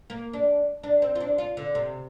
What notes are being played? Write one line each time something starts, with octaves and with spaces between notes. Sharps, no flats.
A#3
D4
D4
C4
F4
D4
F4
D3
C3